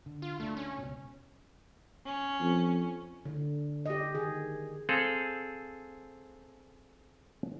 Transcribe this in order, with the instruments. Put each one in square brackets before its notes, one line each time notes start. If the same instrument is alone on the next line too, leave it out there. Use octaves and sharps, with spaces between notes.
[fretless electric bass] D3
[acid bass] F4
[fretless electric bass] D2 D4 [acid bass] A3
[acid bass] C#4
[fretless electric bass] C#2 B2
[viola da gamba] C#4
[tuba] F2
[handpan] D3
G4 D#5
D#3 G#4
[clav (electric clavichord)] C4 G#4 A4 F5